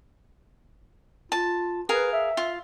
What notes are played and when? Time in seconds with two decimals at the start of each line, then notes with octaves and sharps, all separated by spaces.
1.32 F4 A5
1.89 G#4 A#4 B4 F5
2.13 E5
2.37 F4